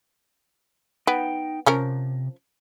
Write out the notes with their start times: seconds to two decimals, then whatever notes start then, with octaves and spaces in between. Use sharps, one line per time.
1.07 B3 D#4 G5
1.66 C3 F3 C#4 A#4